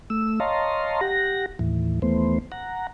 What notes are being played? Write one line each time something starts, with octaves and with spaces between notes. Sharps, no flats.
A3 E6
C#5 D#5 F5 A5 A#5 C6
G4 F#5 A#6
D#2 A2 E3
D#2 E3 A3 B3 C5
F#5 A#5